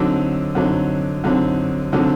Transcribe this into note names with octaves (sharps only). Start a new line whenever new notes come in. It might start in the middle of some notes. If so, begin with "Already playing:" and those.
Already playing: D3 F#3 C4 D#4
D3 F#3 C4 D#4
D3 F#3 C4 D#4
D3 F#3 C4 D#4